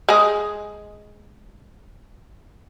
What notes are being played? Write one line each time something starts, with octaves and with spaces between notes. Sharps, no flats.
G#3 G#4